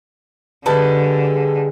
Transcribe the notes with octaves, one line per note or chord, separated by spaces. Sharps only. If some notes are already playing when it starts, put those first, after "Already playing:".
D3 G3 G#3 G#4 B4 A5